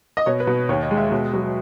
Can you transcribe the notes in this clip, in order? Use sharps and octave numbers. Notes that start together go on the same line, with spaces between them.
D#5
B2 C#5
B4
B2
D#2 C#5
D#5
G#3
E5
B2
F#3